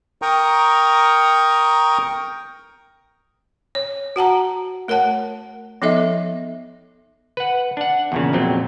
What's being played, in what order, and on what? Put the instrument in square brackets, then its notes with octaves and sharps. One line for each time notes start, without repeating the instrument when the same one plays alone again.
[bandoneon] A#4 G5 A#5 C#6 D#6
[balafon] C#5
F#4 F#5 A5 A#5
A3 A#4 C#5 F#5 A5
F3 B3 D#4 A4 D#5 E5
[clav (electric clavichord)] B4 F#5
D4 F#5
E2 A#2 C#3
F2 A#2 F#3 C4